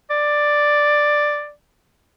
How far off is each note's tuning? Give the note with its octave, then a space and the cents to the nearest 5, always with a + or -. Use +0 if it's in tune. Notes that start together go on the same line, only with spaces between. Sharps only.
D5 +5